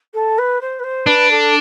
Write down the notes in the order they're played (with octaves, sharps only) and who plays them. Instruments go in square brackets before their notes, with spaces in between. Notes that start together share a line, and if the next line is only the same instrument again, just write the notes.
[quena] A4
B4
C5
B4
C5
[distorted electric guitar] D4 [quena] B4
[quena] A4